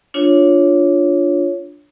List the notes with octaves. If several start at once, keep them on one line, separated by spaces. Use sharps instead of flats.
D4 F4 C#5